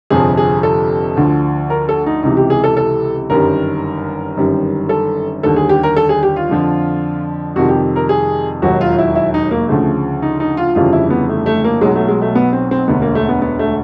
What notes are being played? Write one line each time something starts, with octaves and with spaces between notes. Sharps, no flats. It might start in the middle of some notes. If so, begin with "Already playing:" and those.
G1 F2 C3 F3 G#4
G#4
A4
D2 D3 F3
A#4
A4
D#4
C#2 C3 E3 D#4
G4
G#4
A4
A4
G1 F#2 D#3 G3 A#4
G1 F#2 D#3 G3
A4
D#2 D3 G3 A4
G#4
G4
A#4
A4
G#4
G4
F4
F2 D3 F3
F2 C3 D#3 G3 F#4
G4
A#4
G#4
E1 D#2 D#3 F#3 F#4
F4
E4
E4
D#4
A#3
D2 C#3 F3 A3
D#4
D#4
F4
G1 F2 C#3 E3 G3 F4
E4
B3
A3
A3
A#3
B1 B2 F#3 G#3
A3
G#3
A3
B3
C4
C4
E1 D2 D3 B3
A#3
A3
B3
B3
A3